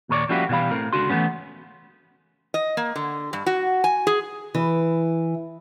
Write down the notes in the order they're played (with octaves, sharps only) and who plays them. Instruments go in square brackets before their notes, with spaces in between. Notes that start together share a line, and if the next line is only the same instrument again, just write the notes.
[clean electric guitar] D#2 A#2 A#4 C#5 D5
F3 G3 A#3 C#4 E4 F#4
B2 E3 G3 F5 B5
A2 C4 A#4
C#2 D3 F#4 C6
E3 F3 A3 B3 C#4
[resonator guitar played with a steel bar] D#5
A#3
D3
G2
F#4
G#5
G#4
[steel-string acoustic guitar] E3